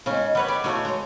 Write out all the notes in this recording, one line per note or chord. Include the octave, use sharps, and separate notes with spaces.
C#3 G#3 C4 C#4 D#4
G3 B4 C#5 F#5
G3 D5
C#3 A3 D#4 F#4 C#5
G#3 C#5 A#5